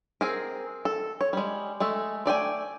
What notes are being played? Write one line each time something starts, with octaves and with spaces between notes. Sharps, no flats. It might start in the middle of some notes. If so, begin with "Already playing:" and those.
C4 G#4 A#4
A4
C#5
G3 G#3
G#3 A3 A4
A3 D5 G5 G#5